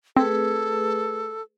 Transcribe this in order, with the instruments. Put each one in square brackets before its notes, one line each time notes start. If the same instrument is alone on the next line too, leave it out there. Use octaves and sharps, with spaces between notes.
[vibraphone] A3 G#4 B4 [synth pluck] C4 [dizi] A4